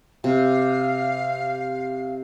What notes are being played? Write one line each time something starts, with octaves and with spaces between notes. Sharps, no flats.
C3 F5